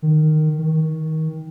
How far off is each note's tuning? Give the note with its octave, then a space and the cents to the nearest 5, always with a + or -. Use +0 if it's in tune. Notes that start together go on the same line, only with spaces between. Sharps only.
D#3 -10
D#3 +25